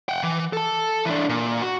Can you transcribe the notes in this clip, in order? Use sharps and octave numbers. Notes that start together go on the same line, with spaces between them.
F#5 G5
E3
A4 A5
E3 D4
A#2
F#4